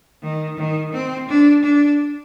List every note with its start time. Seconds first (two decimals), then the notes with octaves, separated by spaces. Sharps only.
0.22 D#3
0.57 D#3
0.93 C4
1.28 D4
1.63 D4